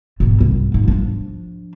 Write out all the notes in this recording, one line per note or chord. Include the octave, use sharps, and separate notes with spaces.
G#2 B2
C2
G#2
F3 D4